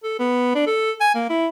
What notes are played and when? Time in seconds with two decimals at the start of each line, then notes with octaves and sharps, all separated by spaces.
0.04 A4
0.19 B3
0.55 D4
0.67 A4
1.01 G#5
1.15 A#3
1.30 E4